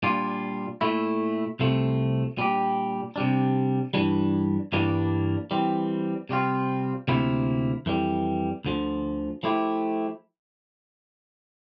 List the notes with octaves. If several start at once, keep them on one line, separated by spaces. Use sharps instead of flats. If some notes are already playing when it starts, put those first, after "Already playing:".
A#2 G3 D4 F4
A#2 A3 E4
C2 C3 F3 A3
A#2 G3 D4 G4
C3 G3 D4
G2 E3 G3 D4
G2 E3 G3 A#3 D4
E3 G3 C4
C3 G3 C4 F4
D2 C3 F3 A#3 E4
F2 E3 G3
D2 D3 F3
F3 A3 E4 G4